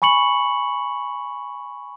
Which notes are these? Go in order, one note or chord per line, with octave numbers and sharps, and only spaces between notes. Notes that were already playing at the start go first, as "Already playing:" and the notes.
G#5 B5 C#6 C#7 F#7